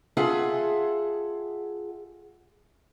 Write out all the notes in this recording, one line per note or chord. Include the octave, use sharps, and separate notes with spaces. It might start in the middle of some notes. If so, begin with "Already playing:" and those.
F4 G#4 A4 E5 F#5